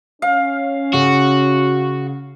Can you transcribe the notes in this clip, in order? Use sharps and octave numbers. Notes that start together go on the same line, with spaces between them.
C#4 F5
C#3 F#4